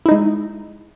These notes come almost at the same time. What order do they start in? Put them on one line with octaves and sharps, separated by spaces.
E4 D#4 G#3